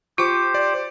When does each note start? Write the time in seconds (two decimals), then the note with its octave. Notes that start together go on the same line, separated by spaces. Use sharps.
0.18 F4 G4 C5 D6 C#7
0.54 D5